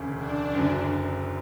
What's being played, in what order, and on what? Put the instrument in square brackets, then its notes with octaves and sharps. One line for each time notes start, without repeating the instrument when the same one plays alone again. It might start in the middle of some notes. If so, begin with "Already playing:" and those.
Already playing: [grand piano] E1 D2 C#3
[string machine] D4
[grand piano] F#1 F#2 D3 F#3